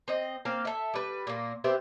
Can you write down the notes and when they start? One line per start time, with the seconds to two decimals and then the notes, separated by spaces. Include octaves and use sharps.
0.08 C4 D#5
0.45 A#3 C4 F5
0.65 A4 E5
0.94 G3 B4
1.27 A#2 A#3
1.64 B3 C4 G4 E5